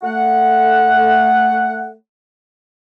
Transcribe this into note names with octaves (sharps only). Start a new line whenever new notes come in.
A3 F#5